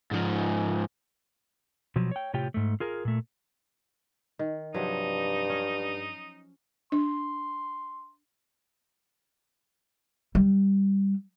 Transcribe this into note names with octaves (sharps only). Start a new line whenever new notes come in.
G#2 F3
B2 F3 F#3
C#5 G5
A2 C3 F4 G4 C#5 G5
G#2 A3
F4 G#4 A#4
A#2 A3
D#3
G2 C3 F3 F#3 D#4
C#4
D4 C6
G3